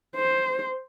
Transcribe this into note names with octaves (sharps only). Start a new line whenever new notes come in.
C5